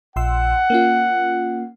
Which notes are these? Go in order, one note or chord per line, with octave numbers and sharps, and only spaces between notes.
A#1 F#5 C6 E6
A#3 C#4 F4